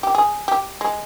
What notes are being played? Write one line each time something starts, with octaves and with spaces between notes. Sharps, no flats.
G4
G#4
G4
G#3